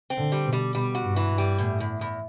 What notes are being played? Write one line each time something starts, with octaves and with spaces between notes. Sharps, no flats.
C4
D3
G3
B2
G3
B2 G3
F#4
G2
E3
G2
G3
E2 A2
E2
E2